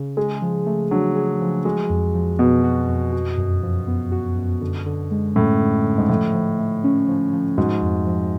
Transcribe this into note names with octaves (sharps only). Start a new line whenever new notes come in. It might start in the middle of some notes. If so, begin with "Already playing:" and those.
Already playing: C#3
G#3 G#4
F3
A3
F#3 D4
G#4
F3
G#3 F#4
F2
F3
B2 B3
F#4
F2
F#4
F#2
F3
B3
F#4
F#2
D3
D3
G#3
A2 C#4
D3
D3
G#2
A2 F3
F3
A3
C#4
F3
F3
G#2 F#4
F2
F3